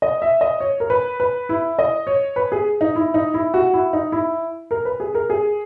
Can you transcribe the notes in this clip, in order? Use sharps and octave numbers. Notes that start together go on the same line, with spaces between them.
D#5
E5
D#5
C#5
A#4
B4
B4
E4
D#5
C#5
B4
G#4
D#4
E4
D#4
E4
F#4
E4
D#4
E4
A#4
B4
G#4
A#4
G#4